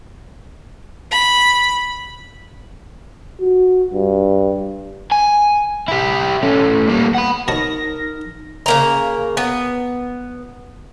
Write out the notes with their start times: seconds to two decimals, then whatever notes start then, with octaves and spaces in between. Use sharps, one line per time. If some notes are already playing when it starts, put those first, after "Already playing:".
1.11 B5
3.41 F#4
3.93 G2
5.12 G#5
5.88 E4 G4
6.42 A3 C#4
6.87 A#2 G3
7.15 F#5 B5
7.48 B2 D#4 A#4 C#5 A5 A#6
8.66 C#3 A#3 A#5
9.37 B3